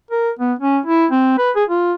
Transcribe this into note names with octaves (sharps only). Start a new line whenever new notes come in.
A#4
B3
C#4
E4
C4
B4
G#4
F4